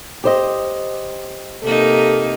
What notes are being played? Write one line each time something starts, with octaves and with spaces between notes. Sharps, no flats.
G4 C5 D#5
C3 A#3 D#4 A4